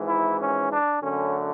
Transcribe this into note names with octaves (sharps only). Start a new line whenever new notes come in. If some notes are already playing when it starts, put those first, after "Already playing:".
Already playing: G#1 G#2 E3
E4
C#4
D4
F#2 D3 A3 C#4